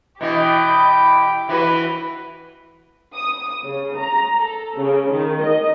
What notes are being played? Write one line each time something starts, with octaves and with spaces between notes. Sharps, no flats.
B2 E3 G4 G5
E3 F#4 B4
D#6
C#3
A#5
A4
C#3
D#3
D#5